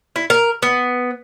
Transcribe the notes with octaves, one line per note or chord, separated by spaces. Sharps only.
E4
A#4
B3